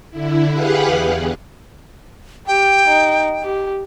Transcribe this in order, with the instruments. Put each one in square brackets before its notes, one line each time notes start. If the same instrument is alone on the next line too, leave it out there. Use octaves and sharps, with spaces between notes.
[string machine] D3 E4
G4 G#4 B4 F5 F#5 F#6
E2
[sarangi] G4 [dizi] G5
[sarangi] D#4
G4